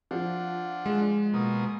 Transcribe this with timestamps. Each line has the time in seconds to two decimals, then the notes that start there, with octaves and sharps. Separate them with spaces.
0.11 F3 D4 F4 F#5
0.86 G#3
1.34 B2 A#3 D#6